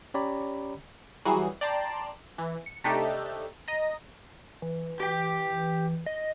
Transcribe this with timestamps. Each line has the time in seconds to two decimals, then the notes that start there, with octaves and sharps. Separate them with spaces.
0.14 C#4 G4 C#5 D5 A#5 B5
1.25 E3 F#3 G3 F#4 G#4 C7
1.61 D5 G5 A5 A#5 C6
2.38 E3
2.66 C#7
2.84 C3 A3 D4 D#4 G4 A4
3.68 D#5 A#5
4.62 E3
5.00 G4 G5
6.06 D#5